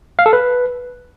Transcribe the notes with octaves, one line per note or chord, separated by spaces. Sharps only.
F5
A4
B4